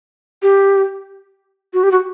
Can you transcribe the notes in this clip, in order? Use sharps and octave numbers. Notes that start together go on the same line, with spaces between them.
G4
F#4
G4
F#4